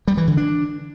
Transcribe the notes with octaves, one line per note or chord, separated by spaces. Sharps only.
G3
E3
D3
D4